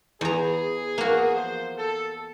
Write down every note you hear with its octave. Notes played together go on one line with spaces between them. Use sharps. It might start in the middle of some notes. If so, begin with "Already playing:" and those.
E2 G#4 A#5
A#3 F#4
F3 C5
A4